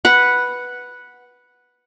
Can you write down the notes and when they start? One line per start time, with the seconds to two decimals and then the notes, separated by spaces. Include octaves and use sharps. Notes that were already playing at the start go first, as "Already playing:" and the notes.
0.05 B4 F#5